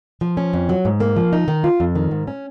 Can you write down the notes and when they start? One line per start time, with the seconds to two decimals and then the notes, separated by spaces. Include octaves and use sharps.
0.21 F3
0.37 C#4
0.53 F2
0.69 F#3
0.85 G#2
1.00 A#3
1.16 F3
1.33 D#4
1.48 D#3
1.64 F4
1.80 F2
1.95 D#3
2.11 G#2
2.27 C#4